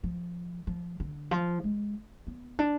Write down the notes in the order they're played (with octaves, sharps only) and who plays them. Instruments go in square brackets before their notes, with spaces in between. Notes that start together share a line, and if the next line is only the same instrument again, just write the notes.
[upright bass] F3
F3
D3
F3
G#3
B3
D4